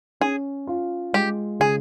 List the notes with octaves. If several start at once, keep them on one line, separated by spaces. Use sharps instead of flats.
C#4 G#4
F4
G#3 G4
C#3 G#4